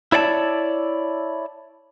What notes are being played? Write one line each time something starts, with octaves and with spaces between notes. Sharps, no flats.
E4 C#5 D5 F#5 A5